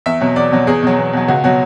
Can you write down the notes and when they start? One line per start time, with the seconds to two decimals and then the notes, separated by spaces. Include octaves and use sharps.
0.06 E2 E5
0.21 B2 F#3
0.36 E2 D5
0.52 B2 F#3
0.67 E2 G#4
0.82 B2 F#3
0.98 E2
1.13 B2 F#3
1.28 C#2 F#4
1.44 B2 F#3 F#4